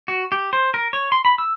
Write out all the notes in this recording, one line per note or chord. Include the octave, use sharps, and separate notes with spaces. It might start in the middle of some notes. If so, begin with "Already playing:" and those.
F#4
G4
C5
A#4
C#5
C6
B5
E6